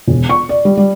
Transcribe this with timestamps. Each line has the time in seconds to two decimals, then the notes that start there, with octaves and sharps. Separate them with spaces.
0.08 E1
0.29 C#6
0.49 D5
0.65 G3
0.77 G3